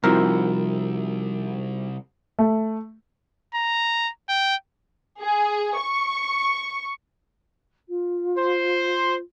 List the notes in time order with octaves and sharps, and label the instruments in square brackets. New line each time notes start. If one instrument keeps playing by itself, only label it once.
[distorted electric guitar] C2 [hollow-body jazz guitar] C3 F3 E4 [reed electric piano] G3 D#4 F#4 [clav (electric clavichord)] A#4
[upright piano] A3
[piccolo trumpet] A#5
G5
[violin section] G#4
C#6
[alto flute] F4
[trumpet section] C5